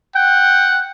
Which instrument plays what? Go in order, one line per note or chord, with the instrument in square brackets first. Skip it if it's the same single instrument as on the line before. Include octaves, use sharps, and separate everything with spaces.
[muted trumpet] F#5 [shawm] G5